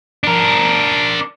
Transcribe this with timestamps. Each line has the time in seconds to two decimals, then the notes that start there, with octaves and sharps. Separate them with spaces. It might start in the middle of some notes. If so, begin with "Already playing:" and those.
0.24 D4 A#4